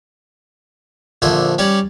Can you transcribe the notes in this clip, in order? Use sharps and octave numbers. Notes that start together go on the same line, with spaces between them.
A#1 D3 C5 E5 G#5
G3 C#4 C#5 D5